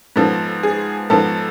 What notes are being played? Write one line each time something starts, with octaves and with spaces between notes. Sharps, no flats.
G#2 F3 B3 A4
G#4
G#2 F3 B3 A4